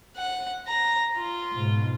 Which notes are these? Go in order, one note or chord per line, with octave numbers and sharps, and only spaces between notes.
F#5
A#5
F4
G#2 B2